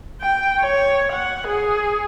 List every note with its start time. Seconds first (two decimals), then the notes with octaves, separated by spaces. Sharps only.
0.21 G5
0.60 C#5
1.13 F#5
1.48 G#4